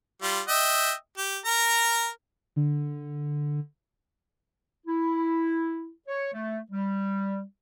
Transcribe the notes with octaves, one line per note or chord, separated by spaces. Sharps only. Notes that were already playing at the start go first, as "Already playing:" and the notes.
G3 F4
D#5 E5 G5
G4
A#4 A#5
D3
E4
C#5
A3
G3